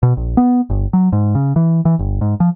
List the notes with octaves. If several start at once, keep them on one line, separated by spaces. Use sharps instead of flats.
B2
A#1
B3
G1
F#3
G#2
C#3
E3
E3
G1
G#2
F3